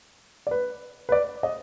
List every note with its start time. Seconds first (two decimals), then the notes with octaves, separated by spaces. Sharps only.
0.47 D5
0.51 B4
1.09 B4
1.12 D5
1.43 D#5